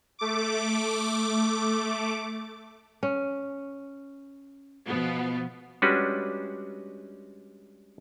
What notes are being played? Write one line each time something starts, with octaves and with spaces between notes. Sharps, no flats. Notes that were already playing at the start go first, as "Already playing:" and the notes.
A3 D6
C#4
B2 F3 B3
G3 G#3 C#4 D4 F#4 B4